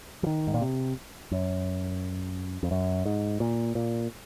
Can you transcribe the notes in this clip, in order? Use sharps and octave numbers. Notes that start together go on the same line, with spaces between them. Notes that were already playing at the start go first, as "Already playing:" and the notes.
F3
D#3
G#2
A#2
C3
F#2
F2
F#2
G#2
A#2
A#2